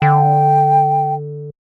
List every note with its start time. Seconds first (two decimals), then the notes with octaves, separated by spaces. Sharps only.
0.02 D3 G5